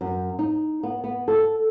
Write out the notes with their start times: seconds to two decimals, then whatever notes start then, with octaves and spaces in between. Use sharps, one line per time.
0.01 F#2
0.39 D#4
0.83 B3
1.04 B3
1.28 A4